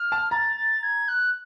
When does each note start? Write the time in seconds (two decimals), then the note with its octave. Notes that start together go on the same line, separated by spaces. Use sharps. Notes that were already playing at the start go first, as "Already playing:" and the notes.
Already playing: F6
0.12 A5
0.31 A#5 A6
0.56 A6
0.83 G#6
1.08 F#6